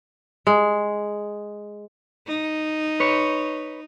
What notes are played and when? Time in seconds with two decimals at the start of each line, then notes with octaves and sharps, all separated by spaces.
0.47 G#3
2.27 D#4
3.00 B4 C#5